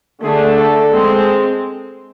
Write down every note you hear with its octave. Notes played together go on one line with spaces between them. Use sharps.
D3 A3 D4 G#4
A4
G#3 C4